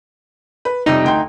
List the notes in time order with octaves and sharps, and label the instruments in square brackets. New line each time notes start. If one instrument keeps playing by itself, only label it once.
[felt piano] B4
[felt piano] F2 C3 G3 [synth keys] D#4
[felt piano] D2 G5 C6